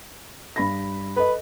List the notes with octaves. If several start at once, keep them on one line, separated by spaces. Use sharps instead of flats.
G2 B5 A#6
A4 B4 D#5